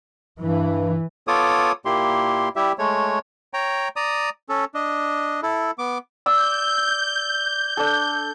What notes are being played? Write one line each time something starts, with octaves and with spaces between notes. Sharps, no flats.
G2 E3
B3 F4 A4 C#5 D6 D#6
A#2 A#3 E4 G4 C6
G3 E4 G4 E5
G#3 A3 C#5
C#5 G5 A#5
D5 A#5 D#6
C#4 A4
D4 D#5
E4 A4
B3 D6
D5 E6 G6
D4 A4